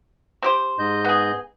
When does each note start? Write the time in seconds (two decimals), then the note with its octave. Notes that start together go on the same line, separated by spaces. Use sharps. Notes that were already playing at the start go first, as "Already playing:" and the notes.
0.42 C4 G4 C5
0.79 G#2 D#5 G6
1.05 B3 G#4